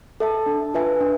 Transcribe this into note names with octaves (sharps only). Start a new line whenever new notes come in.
A4 E5 A5
D4
F4 B4 E5 G#5
D4